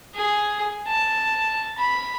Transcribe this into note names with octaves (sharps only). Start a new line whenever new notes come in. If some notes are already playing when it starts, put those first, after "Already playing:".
G#4
A5
B5